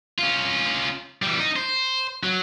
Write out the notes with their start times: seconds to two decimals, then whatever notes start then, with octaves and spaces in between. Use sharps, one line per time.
0.19 C#4 F4
1.22 E3 G3
1.39 D#4
1.56 C5
2.23 F#3